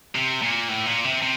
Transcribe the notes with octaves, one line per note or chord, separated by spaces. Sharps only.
C3
A#2
A2
A#2
C3
C3